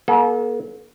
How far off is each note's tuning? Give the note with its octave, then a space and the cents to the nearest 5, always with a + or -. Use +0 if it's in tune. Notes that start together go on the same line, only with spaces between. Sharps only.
A#3 +45 A4 -35